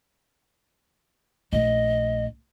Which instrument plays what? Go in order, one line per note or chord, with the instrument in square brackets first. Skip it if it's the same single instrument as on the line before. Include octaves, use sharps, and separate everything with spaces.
[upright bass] A#1 A3 [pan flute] D#5